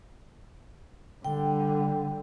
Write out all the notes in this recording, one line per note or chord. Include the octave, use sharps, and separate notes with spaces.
D3 G3 G5